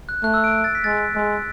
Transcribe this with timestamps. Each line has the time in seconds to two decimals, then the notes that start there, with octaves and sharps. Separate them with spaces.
0.09 F#6
0.23 A3 F#6
0.34 E6
0.44 D7
0.64 A6
0.75 B6
0.84 G#3 A6
1.15 G#3